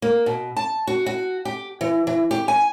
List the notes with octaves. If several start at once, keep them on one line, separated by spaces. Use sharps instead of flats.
A#3
B2
A5
F#4
F#4
G4
E3
E3
G4
G#5